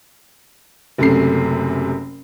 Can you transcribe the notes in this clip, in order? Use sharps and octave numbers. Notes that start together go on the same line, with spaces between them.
F#1 F#2 C3 A3 C7